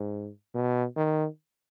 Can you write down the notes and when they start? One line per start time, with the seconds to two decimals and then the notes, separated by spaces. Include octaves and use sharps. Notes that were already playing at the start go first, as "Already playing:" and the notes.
Already playing: G#2
0.55 B2
0.97 D#3